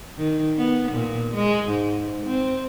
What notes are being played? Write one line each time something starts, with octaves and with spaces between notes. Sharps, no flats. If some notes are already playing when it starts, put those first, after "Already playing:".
D#3
B3
A#2
G#3
G#2
C4